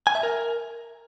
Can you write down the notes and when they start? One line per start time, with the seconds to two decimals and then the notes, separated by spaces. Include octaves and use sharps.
0.07 G#5
0.15 E5
0.23 A#4